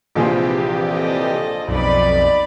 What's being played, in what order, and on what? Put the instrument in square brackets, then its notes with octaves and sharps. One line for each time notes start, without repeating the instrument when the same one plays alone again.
[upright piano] A#1 F3 G#4 [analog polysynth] C3 E3 G4
[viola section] A4 D5 D#5
[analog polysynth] B1 F2 [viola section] D#4 D5 B5